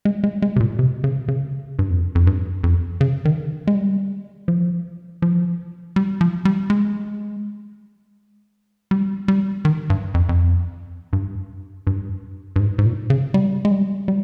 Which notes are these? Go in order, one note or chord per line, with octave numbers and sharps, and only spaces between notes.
G#3
G#3
G#3
C3
A#2
C3
C#3
C#3
G2
F2
F2
G2
F2
C#3
D#3
G#3
G3
F3
F3
G3
F3
G3
G#3
G3
G3
D#3
G2
F2
F2
G2
G2
G2
G#2
G#2
A#2
C#3
G3
G#3
G3
G3